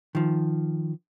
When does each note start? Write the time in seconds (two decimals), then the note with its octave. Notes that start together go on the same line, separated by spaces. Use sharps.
0.15 D#3 F3